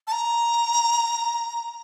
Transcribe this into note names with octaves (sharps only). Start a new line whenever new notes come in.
A5
A#5